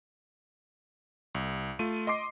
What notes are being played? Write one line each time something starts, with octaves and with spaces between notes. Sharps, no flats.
C2
A3 F4 D#7
D#5 C6 D6 C7